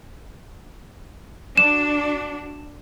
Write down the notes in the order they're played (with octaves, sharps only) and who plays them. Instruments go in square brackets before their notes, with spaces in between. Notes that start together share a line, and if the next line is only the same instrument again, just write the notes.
[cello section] D4 F#4 [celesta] E7